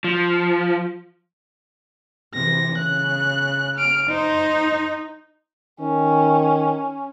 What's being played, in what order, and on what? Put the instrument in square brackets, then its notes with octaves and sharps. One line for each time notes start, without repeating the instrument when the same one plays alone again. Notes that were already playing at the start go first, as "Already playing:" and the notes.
[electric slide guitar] F3
[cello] C3 E3 [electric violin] A#6
[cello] C#3 [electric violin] F#6
[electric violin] F6 D7
[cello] D#4 [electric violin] C5
[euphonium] D#3 [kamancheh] C#4